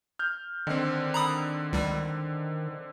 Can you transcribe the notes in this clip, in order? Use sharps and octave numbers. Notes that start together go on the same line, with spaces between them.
F6 G6
D3 D#3 C4
A#5 B5 D#6
C#2 G3